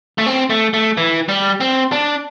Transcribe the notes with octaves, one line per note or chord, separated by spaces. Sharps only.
A3
C4
A3
A3
E3
G3
C4
D4